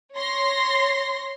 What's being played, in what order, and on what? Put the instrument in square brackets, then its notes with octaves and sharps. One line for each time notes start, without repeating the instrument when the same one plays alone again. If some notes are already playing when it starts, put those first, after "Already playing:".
[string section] C#5 C6 A#6